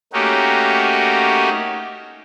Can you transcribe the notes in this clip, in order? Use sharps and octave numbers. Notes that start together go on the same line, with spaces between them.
A3 A#3 C#4 D#4 F#4 G4